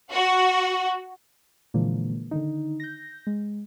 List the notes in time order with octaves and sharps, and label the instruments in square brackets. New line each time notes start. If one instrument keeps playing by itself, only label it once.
[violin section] F#4
[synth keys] A#2 D3 E3 F3 G#3 A#3
D3 D#3 D#4
G6 A#6
G#3